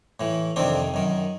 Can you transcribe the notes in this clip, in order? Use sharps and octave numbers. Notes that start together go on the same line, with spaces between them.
A2 E3
F2 C3 D#3 C4 D4
F#2 D#3